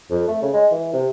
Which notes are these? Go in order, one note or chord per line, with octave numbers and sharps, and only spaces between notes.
F2
A3
C#3
G#3
E3
C3